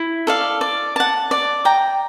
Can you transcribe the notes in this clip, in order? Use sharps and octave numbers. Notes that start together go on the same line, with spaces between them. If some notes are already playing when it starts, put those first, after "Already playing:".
Already playing: E4
A4 D5 F5
D5
F#5 A5
D5
G5 A#5